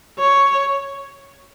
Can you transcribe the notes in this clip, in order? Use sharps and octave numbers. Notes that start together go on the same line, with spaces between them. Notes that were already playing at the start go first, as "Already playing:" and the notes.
C#5